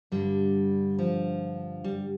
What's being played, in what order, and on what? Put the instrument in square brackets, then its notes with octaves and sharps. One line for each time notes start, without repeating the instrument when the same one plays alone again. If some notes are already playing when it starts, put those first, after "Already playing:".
[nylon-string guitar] G2 D3 G3
F3
G3